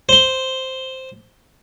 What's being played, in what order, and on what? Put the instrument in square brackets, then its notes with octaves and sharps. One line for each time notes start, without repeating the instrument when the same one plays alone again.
[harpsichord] C5 C6